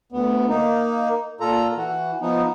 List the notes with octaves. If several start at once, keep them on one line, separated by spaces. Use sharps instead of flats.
D2 B3
A#3 D#4
A#2 F4 A4 A#5
E3 F#4
F3 B3 D#4